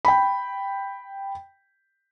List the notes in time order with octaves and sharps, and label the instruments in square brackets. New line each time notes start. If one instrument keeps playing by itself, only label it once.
[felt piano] G5 B5